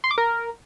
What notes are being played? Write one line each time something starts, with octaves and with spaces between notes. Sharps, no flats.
C6
D6
A#4